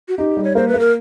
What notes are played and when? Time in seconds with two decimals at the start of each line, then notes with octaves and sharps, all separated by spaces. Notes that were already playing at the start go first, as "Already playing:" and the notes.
0.08 F#4
0.18 D#4 G4
0.37 G3
0.44 C#5
0.55 A#3 C5
0.68 B4
0.74 A#3
0.80 A#4